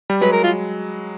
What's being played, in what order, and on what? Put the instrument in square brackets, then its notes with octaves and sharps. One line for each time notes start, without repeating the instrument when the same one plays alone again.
[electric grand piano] G3
[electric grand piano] F#3 G#3 [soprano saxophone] B4
[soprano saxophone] A#4
F4